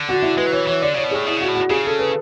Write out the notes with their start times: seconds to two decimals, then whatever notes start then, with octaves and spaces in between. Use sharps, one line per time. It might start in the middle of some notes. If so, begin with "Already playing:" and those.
Already playing: D3
0.09 F#4
0.22 E4
0.37 G#3 B4
0.46 F#3
0.52 E3 C#5
0.67 E3 C#5
0.82 D3 D5
0.93 C#3 C#5
1.04 B2
1.11 A2 G#4
1.26 B2 E4
1.37 C#3 F#4
1.48 A2
1.55 F#4
1.70 C#3 G#4
1.85 A4
1.99 B4